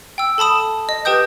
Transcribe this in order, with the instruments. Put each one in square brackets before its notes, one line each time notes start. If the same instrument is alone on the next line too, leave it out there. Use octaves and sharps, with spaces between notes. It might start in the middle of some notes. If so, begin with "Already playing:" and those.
[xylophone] G5 E6
A4 A5 B5 D#6 E7
D#5
G4 B4 G5 D#6 G6